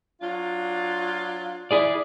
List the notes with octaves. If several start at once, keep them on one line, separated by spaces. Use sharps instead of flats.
F#3 D4 F4
E4 G#4 D5